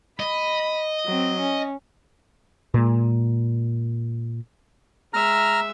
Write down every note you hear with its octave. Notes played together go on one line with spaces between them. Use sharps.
D#5 B5
F#3 C4
C#4
A#2 G#3
G#3 E5 A#5 F6